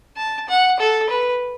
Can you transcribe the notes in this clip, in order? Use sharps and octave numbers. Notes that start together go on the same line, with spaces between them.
A5
F#5
A4
B4